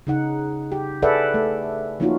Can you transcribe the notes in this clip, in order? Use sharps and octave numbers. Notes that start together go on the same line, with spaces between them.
C#3 D#4 F#5
G4
G#4 A4 B4 D5 E5 F#5
A3
F3 A#3 C#4 D#4 F4 F#4